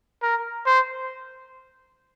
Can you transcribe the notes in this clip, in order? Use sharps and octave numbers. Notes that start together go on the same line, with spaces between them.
A#4
C5